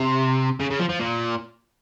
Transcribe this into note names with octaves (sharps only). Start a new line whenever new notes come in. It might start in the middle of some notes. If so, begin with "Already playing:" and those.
Already playing: C3
C#3
C#3
F3
F3
A#2